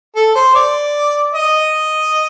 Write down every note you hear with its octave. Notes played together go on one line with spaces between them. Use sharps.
A4
C5
D5
D#5